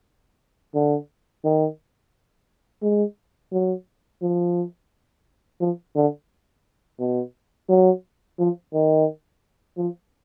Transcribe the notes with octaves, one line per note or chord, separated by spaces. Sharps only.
D3
D#3
G#3
F#3
F3
F3
D3
B2
F#3
F3
D#3
F3